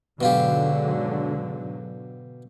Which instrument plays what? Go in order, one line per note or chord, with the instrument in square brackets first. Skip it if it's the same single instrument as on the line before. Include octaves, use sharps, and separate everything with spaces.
[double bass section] G#2 D3 F#3 [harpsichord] B2 F4 G4